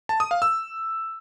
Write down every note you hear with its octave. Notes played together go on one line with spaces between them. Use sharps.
A5
D#6
F5
E6